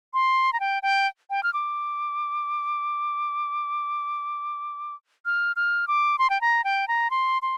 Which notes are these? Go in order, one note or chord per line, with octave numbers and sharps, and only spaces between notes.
C6
A#5
G5
G5
G5
F6
D6
F6
F6
D6
C6
G5
A#5
G5
A#5
C6
C6